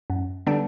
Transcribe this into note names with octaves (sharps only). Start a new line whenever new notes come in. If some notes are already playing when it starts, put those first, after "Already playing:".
F#2
D3 G3 B3 D4